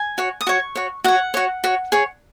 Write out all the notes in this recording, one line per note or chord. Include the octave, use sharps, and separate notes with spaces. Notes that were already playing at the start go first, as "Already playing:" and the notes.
Already playing: G#5
F#4 C#5
D#6
F#4 C#5 C#6
F#4 C#5
F#4 C#5 F#5
F#4 C#5
F#4 C#5
G#4 C#5